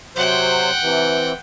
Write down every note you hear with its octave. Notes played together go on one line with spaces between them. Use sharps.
C3 F#3 C5 F#5 G5
C3 E3